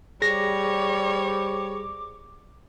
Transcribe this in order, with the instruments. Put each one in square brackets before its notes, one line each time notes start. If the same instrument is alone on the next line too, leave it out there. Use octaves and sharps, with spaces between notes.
[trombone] G3 [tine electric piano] G#4 A#6 [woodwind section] C5 D6 [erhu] C#5